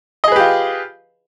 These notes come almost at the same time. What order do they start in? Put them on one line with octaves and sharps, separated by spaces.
D#5 G#4 B4 G4 F4